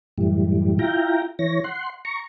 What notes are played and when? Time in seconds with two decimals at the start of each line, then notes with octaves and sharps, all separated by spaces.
0.18 F#2 A2 E3 G3
0.79 E4 F4 G5 A#5
1.39 E3 C#5 A#6
1.64 F#5 C6
2.05 A#5 C#6